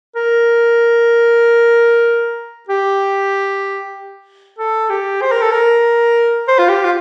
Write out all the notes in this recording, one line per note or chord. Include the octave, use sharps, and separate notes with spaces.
A#4
G4
A4
G4
C5
A#4
A4
A#4
C5
F4
G4
F4